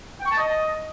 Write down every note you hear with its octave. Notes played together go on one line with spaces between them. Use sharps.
G5
C#6
A5
D#5